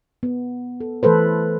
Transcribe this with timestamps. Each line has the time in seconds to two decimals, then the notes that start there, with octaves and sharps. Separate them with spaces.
0.23 B3
0.81 A4
1.03 E3 A3 A4 B4 C5